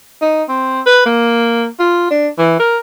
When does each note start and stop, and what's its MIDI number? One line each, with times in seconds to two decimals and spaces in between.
0.21 0.44 63
0.49 0.81 60
0.86 1.01 71
1.06 1.67 58
1.79 2.08 65
2.10 2.29 62
2.38 2.58 52
2.59 2.78 70